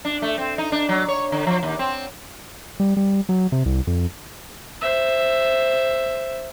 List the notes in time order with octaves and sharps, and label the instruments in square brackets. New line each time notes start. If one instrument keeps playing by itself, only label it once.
[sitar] D4
A3
C4
D#4
D4
F#3
C#5
D3
F3
D#2
C4
[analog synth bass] G3
G3
F#3
C3
C2
F2
[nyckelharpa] C5 E5